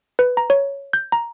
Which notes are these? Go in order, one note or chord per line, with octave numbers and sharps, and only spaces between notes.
B4
A#5
C#5
G6
A#5